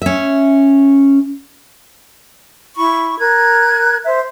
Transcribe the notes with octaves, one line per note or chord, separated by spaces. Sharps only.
C#4 E5
E4 B5 C#6
A#4 F#6 G#6
C5 E5